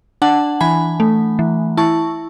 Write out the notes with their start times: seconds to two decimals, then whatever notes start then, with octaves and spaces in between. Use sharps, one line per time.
0.22 D4 F#5 A5
0.60 E3 G#5 B5
1.00 A3
1.39 E3
1.77 E4 A5 C#6